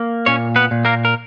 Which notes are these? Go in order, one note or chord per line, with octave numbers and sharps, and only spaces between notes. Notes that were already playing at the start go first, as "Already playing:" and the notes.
Already playing: A#3
A#2 C#4 C#5
B3 B4
A#2
A#3 A#4
A#4